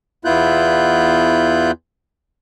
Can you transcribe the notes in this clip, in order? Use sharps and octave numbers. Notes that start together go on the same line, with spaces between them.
E2 B3 E4 F4 F#6 G6